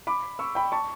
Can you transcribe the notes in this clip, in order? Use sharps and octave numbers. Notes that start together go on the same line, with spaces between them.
B5 D6
C#6 E6
G5 B5
A5 C#6